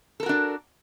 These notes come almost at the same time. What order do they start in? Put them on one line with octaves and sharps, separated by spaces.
A4 A#4 F#4 D4